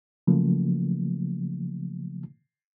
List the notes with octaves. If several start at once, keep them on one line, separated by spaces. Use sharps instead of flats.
C#3 F3 F#3 A3 A#3